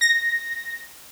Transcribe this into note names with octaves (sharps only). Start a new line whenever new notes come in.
A#6